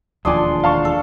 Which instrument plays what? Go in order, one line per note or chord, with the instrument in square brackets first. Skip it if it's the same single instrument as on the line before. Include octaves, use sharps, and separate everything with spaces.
[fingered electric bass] E1 D#2 F3 [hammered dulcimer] D4 C6 [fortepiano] G#5 D6 D#6
[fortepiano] F5 A5 C#6
[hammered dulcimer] A4